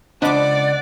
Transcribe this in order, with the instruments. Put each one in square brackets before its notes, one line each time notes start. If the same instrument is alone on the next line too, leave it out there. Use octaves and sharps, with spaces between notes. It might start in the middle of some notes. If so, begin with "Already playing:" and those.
[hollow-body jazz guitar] C#2 C5 D#5 [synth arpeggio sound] D4 B5 D6 [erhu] D5 [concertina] F#5